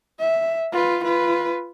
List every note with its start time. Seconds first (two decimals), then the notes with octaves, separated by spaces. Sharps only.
0.20 E5
0.72 F4 B4
1.04 F4 B4